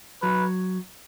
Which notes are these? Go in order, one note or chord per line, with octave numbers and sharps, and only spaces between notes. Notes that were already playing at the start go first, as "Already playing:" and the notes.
F#3 B4